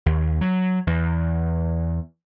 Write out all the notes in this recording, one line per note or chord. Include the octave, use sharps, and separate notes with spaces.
D#2
F#3
E2